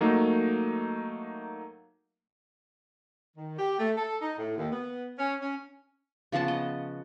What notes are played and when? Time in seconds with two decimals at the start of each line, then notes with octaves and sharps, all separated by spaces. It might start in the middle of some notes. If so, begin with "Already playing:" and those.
0.01 F#3 A3 A#3 D#4
3.36 D#3
3.58 G4
3.78 A3
3.97 A4
4.21 D#4
4.37 A2
4.57 D#2
4.71 B3
5.18 C#4
5.40 C#4
6.32 C#3 F3 B3 A5
6.48 D#5